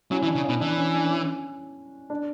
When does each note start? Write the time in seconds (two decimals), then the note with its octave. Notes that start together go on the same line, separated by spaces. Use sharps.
0.11 F#3 C#4 E4
0.23 E3
0.27 D4
0.35 C#3
0.44 B2 C#4 E4
0.60 E3 D4
0.78 C#4
0.94 D4
1.03 C#4
1.25 C#4
2.10 D4